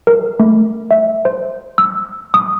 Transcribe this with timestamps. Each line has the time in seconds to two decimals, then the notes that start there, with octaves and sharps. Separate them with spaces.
0.07 A#4
0.40 A3
0.91 E5
1.25 C5
1.78 E6
2.34 D#6